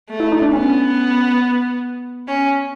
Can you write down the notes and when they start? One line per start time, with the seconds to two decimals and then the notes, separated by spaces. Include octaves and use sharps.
0.10 A3
0.20 E4
0.32 D#4
0.42 D4
0.53 B3 C#4
2.28 C#4